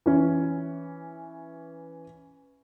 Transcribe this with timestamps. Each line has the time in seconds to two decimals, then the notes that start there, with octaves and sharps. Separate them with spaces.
0.06 E3 C#4